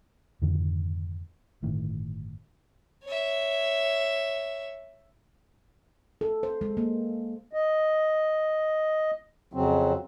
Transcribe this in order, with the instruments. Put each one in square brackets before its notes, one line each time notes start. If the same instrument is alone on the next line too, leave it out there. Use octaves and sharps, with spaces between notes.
[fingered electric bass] F2 G#2 D3 D#3
G1 A2 D#3
[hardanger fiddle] C#5 E5
[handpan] A4
C5
G#3
A#3
[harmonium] D#5
F2 C#3 F#3 C4